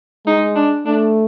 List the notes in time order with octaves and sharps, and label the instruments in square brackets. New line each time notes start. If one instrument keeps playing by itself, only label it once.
[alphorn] G#3 [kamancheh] D#4
[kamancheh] D4
[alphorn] A3 [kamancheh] D4